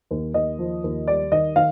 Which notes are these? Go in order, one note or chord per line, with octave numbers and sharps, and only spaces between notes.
D#2
D#2 D#5
F3
D#2
G3 D5
D#3 D#5
D#3 F5